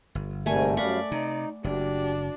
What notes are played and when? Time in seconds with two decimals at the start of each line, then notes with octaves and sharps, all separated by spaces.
0.15 G1
0.46 G#2 C3 G3 A3 A#4 G#5 C#6
0.77 F#2 G3 D5 F5 F#5 B5 C#6
1.11 C3 D#4
1.64 F#1 D4 F#4 G4